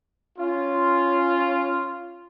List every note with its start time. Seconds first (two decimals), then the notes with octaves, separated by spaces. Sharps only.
0.39 C#4 F4